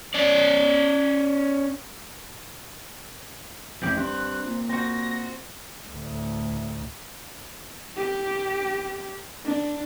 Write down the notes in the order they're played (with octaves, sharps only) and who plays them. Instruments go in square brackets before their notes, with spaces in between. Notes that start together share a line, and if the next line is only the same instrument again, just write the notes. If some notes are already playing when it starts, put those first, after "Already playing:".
[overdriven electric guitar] C#4 D5
[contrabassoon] A1 [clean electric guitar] F2 E3 G4 [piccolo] G6
[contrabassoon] G2 [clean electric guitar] C4 [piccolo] F#6
[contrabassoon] A#2
[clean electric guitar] C4 F#4 [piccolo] A#6
[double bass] D2 A2
[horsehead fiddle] G4
D4